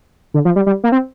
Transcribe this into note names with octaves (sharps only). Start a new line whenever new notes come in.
D3
F3
G3
G3
A#3
C4